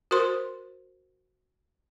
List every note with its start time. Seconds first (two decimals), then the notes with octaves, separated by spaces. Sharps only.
0.11 F#4 A#4 C5 C6